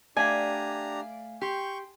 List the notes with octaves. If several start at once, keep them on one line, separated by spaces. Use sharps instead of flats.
A3 D4 G4 D5 F5 G#5 A#5 B6
G4 G5 C6 C#6 G6 C7